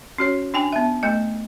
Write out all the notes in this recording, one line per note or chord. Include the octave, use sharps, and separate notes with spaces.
C#4 F#4 C#5
D4 G5 G#5
B3 E5
A3 D#5